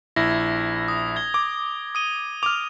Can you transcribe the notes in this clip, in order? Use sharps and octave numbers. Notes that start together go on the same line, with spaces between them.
A#1 E4 G#6 A#6
D#6
G#6 G7
D6
D#6 D#7 G7
D6 F6 F7